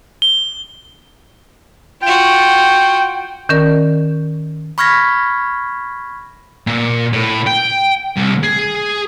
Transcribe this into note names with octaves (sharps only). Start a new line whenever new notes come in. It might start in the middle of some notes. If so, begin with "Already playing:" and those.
G7
F4 F#4 G5
D#3 C#4 A#4 D5
B5 C#6 F6 G#6 A#6 B6
A#2
A2
G5
C2
G#4